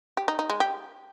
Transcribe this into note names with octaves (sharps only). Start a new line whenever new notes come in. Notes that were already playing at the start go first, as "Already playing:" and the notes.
G4
D#4
D#4
G#3
G4